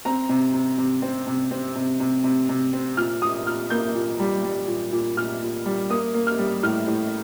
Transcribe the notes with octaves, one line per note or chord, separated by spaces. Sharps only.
C4 A#5
C3
C3
C3
C4
C3
C4
C3
C3
C3
C3
C4
A#2 F6
A#2 D#6
A#2 F6
A#3 G6
A#2
G3
G3
A#2
A#2
A#2 F6
A#2
G3
A#3 D#6
A#3
F6
G3
A2 F6
A2